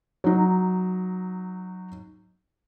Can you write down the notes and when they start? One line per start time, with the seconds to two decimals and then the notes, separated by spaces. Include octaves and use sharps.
0.24 F#3 D#4